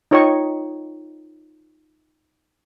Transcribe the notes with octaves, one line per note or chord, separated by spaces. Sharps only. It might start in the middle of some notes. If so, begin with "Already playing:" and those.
D#4 F4 C#5 D#5 G5 C#6